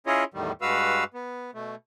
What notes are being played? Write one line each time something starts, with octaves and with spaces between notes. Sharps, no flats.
C#4 E4 F4 G#4 C#5 D#5
E2 A2 D#3 G3
G2 G#3 F#4 B4 F5 E6
B3
B2 A3